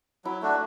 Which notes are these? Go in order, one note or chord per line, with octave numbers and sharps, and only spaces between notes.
F#3 E4
A3 D4 F#4